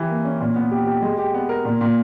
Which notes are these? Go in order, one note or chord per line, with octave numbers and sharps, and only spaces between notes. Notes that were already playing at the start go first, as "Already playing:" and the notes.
Already playing: E3 G4
A#3
C#4
A#2
B3
G4
G4
G#3
G4
B3
A#4
A#2
A#2